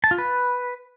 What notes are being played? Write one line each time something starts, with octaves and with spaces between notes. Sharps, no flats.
A5
F4
B4